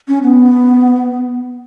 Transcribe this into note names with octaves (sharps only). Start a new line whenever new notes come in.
C#4
B3